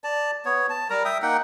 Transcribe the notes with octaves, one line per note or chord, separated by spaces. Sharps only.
D5 A5
B3 C#5
A5
G3 A#4 A#5
E5 G5 D#6
A#3 D#4 F#5 G5